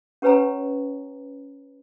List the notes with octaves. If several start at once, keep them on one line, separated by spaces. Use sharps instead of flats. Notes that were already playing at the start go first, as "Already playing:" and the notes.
C#4 G4 B4 C#5 G#5 A#5